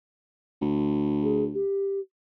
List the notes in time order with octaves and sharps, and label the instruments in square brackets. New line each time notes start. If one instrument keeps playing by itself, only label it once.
[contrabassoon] D2
[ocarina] G#4
G4